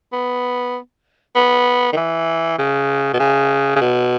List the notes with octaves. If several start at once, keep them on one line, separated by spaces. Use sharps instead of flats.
B3
B3
D#3
E3
C#3
B2
C#3
C#3
B2